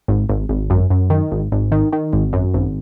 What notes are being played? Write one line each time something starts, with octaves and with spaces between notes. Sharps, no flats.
G#1
G#1
G#1
F#2
F#2
D#3
G#1
G#1
D#3
D#3
G#1
F#2
G#1